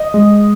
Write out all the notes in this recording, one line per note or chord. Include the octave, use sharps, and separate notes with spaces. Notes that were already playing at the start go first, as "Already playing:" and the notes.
Already playing: D#5
G#3